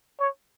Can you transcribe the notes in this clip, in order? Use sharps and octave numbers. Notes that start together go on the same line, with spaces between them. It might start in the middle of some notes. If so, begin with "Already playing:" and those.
C#5